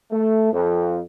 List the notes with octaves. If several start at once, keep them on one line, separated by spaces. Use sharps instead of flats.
A3
F2